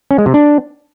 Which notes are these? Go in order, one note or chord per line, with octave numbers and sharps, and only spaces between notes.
C#4
G#3
C3
D4